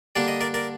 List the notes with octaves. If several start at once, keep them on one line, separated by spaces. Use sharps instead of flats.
D3 G3 A#3 D4 D5
D#5
A#4 D5
A#4 D5